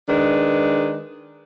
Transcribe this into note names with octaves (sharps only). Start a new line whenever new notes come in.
D#3 G#3 D4 B4